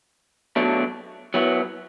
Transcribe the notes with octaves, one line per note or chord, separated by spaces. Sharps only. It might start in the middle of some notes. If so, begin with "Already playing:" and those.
B2 F#3 A3 D4
F#3 B3 E4